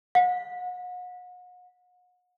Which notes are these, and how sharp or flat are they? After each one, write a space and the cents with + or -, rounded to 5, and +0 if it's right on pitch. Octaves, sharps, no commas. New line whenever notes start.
F#5 -40